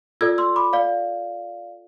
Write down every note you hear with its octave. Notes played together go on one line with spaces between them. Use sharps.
F4 A4 D5 E6 G#6
C6 E6
B5 D6
D5 F5